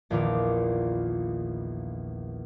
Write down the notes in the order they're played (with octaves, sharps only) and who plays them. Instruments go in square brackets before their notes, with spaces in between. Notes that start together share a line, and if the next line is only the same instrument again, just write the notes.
[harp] A#1 E2 A#2 D#3 F4 D6